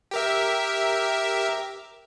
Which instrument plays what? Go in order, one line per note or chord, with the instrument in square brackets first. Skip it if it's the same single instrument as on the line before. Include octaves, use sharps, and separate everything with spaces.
[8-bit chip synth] G4 A#4 E5